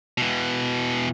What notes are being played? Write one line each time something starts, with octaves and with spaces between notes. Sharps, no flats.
B2 E3